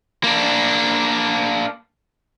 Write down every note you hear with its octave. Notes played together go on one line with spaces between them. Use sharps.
A#3 D4